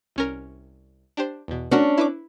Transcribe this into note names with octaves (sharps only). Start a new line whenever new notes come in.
C2 C#4 A#4
D4 G4 C5
E2 B2
A3 C#4 D4 F#4 A#4
E4 B4 D6